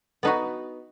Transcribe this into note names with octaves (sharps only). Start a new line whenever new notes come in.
B3 D#4 F#4 B4